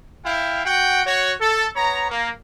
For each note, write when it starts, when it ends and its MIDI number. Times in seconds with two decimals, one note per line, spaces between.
0.25 0.62 64
0.25 0.62 77
0.25 0.62 79
0.63 1.02 66
0.63 1.02 78
0.63 1.02 79
1.04 1.32 66
1.04 1.32 73
1.40 1.66 69
1.75 2.05 59
1.75 2.05 73
1.75 2.05 82
2.11 2.30 58